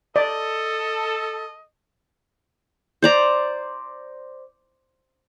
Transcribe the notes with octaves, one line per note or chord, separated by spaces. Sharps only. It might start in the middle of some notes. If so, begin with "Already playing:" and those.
A4 D5 D#5
C5 D5 A#5